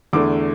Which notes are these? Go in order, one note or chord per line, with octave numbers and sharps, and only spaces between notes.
E2 D3 A3 D6